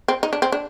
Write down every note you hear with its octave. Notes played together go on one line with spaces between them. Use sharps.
C4
D#4
D4
C4
D4